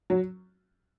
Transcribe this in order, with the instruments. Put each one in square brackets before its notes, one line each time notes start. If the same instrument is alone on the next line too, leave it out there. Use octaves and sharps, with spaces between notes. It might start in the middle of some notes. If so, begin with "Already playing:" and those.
[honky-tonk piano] F#3